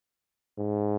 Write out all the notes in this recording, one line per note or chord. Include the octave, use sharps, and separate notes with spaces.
G#2